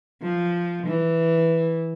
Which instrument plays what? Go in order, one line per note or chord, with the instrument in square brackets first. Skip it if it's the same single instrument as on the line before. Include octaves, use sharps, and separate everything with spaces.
[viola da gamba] F3
E3